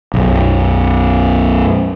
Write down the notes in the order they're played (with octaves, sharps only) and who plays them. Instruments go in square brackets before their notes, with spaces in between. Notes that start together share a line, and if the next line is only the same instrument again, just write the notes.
[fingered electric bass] B1 F#2